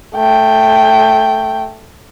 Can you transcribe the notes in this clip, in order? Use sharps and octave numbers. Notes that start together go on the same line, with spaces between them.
A3 G5